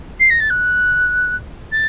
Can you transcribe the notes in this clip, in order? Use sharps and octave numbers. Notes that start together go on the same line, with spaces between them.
C7
A#6
A6
F#6
A6